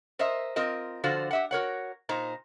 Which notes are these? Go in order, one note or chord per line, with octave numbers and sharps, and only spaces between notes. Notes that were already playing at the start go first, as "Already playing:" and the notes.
A#4 C5 D#5 E5
C4 F4 A#4 D#5
D3 F3 F4 F#4 C5
G4 E5 F#5
F#4 A#4 C#5 F#5
A#2 D#4 C5 A#5